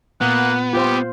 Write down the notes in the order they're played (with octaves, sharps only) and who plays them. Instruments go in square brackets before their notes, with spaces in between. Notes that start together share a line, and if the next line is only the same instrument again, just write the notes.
[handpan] A#2 [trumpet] A#3 [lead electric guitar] B3 [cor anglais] F#5
[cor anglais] G3 [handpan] F4 C5 [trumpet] G4